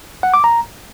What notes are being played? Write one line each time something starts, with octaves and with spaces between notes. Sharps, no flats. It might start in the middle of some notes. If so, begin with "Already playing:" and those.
F#5
D6
A#5